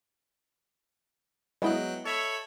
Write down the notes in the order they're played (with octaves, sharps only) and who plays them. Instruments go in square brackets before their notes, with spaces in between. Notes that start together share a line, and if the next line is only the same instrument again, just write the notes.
[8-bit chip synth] F#3 G5 F#6 [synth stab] G#3 B3 E4 [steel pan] D#5
[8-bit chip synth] A4 E5 B5 [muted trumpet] C#5